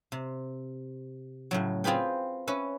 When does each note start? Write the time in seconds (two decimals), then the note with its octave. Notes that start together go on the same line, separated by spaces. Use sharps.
0.12 C3
1.51 A2 C#3 F#3
1.84 C4 F4 G#4 B4 G5
2.47 C#4 B4 E5